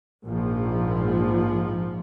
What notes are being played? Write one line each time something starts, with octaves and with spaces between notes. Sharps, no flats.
A#1 G#2 F3